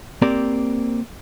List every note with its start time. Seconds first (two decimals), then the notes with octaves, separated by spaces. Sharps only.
0.22 A#3 C4 G4 A#4 D5